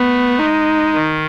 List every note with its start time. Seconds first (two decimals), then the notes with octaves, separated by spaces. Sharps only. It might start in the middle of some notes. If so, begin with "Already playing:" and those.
Already playing: A3 B3
0.39 G#3 D#4
0.94 D#3